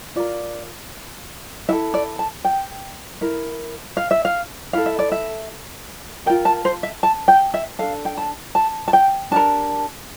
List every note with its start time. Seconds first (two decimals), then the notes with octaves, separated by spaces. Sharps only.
0.16 F4 A#4 D5
1.69 E4 E5
1.72 A4
1.94 D5
2.19 A5
2.45 G5
3.21 E4 A#4
3.97 F5
4.11 E5
4.25 F5
4.73 E4 A4 F5
4.86 E5
4.99 D5
5.12 E5
6.26 A#4 G5
6.30 F4
6.45 A5
6.65 C5
6.83 E5
7.03 A5
7.28 G5
7.54 E5
7.79 D4 A4 F5
8.05 G5
8.17 A5
8.55 A5
8.88 A5
8.93 G5
9.31 D4 G4 A#4 A5